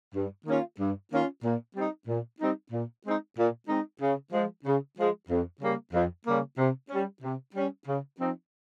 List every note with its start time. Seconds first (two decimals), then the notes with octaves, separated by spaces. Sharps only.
0.14 G2
0.46 D#3 A#3 C#4 F4
0.79 G2
1.11 D#3 A#3 C#4 F4
1.43 A#2
1.75 G3 C4 D#4
2.08 A#2
2.40 G3 C4 D#4
2.72 A#2
3.04 G#3 C4 D#4
3.37 A#2
3.68 G#3 C4 D#4
4.01 C#3
4.33 F3 G#3
4.65 C#3
4.97 F3 G#3
5.29 F2
5.61 C#3 G3 A#3
5.93 F2
6.26 C#3 G3 A#3
6.58 C3
6.90 G3 C#4
7.22 C3
7.55 G3 C#4
7.87 C#3
8.19 F3 C4 D#4